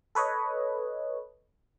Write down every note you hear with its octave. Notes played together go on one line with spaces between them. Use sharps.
A4 B4 C#5 D#5